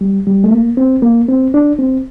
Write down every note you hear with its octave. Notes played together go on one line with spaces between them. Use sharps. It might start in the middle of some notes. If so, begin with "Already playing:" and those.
G3
G3
A3
A#3
C4
A#3
C4
D4
C4